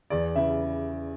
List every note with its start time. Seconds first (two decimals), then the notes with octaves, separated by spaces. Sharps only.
0.10 E2 D5
0.36 C#3 E3 E5